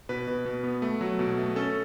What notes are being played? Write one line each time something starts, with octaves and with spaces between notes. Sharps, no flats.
B2 B4
B2
B2
B3
A3
F#3
B2
A3
C#4 A4